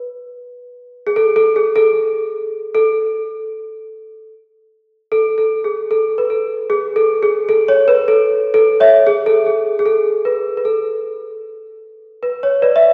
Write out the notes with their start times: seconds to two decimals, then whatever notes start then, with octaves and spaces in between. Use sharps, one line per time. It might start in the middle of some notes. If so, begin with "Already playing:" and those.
Already playing: B4
1.07 G#4
1.16 A4
1.36 A4
1.56 G#4
1.76 A4
2.75 A4
5.12 A4
5.38 A4
5.64 G#4
5.91 A4
6.18 B4
6.30 A4
6.70 G#4
6.96 A4
7.23 G#4
7.49 A4
7.68 C#5
7.88 B4
8.08 A4
8.54 A4
8.80 C#5 E5
9.07 G#4
9.26 A4
9.46 G#4
9.79 G#4
9.86 A4
10.25 B4
10.57 B4
10.65 A4
12.23 B4
12.43 C#5
12.62 B4 D5
12.76 E5